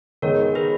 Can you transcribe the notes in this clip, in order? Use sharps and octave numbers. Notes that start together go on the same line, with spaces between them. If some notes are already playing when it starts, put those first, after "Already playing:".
D#3 G#3 B3 A#4 C#5
G#4 B4